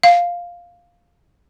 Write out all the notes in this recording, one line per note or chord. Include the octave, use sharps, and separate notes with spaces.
F5